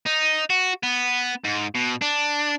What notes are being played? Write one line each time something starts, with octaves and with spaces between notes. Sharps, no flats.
D#4
F#4
B3
G#2
B2
D4